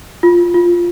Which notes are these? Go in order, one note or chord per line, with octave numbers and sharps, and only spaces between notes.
F4
F4